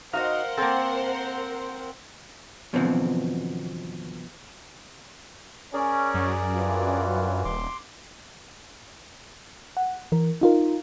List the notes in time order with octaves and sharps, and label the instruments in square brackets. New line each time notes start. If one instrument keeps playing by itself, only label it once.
[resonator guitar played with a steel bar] D#4 F#4 D#5 [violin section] A#4 C5 F#5 [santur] F5
[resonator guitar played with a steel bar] A#3 A4 [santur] C4
[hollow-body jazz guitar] F#2 B2 D3 E3 F3 C4
[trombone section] C#4 [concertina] G#4 A#4 D5
[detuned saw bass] F#2
[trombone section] G2 E3 F4
[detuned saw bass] D#1 [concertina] C6 D6
[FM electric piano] F#5
E3 A#4
D#4 F4 A#4